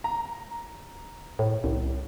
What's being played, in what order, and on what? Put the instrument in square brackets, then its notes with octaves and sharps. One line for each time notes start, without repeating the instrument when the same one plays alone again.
[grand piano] A#5
[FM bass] A2
C2